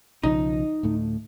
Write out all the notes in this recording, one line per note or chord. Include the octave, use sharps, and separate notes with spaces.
B1 C#3 F3 D#4
D2 A2 A3